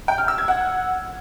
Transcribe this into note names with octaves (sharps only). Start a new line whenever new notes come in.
G5
F6
E6
G#6
F#5